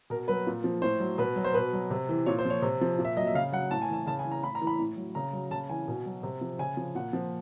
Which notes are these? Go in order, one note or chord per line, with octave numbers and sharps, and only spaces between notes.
B2 A#4
F#3 B4
A#2
F3
A2 C5
F#3
B2 B4
F#3
C5
B2 B4
F#3
C3
E3
A#2 C#5
C5
F3 C#5
C3
F3
A#2
E5
F#3 D#5
E5
C#3 F5
F#3 F#5
A2 A5
G#5
E3 A5
C#3 A5
G#5
E3
A#5
A2 B5
A#5
E3
B5
A2
F#3
C#3 A#5
F#3
C#3 A5
E3 G#5
B2
F#3
C3
F3
C#3 G#5
F3
A#2 F#5
F3